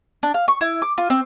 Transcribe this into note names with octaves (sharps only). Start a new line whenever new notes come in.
D4
F5
C#6
E4
D6
F4
C4